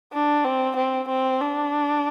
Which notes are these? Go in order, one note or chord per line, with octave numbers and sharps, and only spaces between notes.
D4
C4
C4
C4
D4